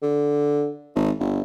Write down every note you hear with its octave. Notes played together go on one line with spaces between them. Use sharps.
D3
G#1
G1